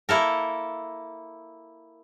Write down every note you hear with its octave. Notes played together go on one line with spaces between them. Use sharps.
A#3 E4 A4 A#4